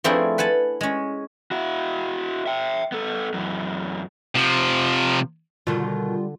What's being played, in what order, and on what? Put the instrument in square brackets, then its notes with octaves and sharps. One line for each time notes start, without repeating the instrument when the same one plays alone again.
[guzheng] F3 A3 C4 D4 E4 G#4
B4 F#5 G#5 A5
G#3 C#4
[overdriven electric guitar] E4 F#4
E5 G5
B3 A4
F#2 E3
[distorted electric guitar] C3 F3
[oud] B2 D#3 [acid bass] D3 [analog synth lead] G3 [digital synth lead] F4